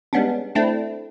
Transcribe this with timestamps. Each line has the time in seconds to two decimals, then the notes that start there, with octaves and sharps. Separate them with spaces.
0.13 G3 G#3 B3 C#4 D4
0.55 A3 C4 D4 E4